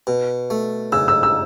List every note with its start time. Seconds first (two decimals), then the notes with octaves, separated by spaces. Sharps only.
0.07 B2
0.50 A3
0.92 C#3 E6
1.08 E6
1.23 E6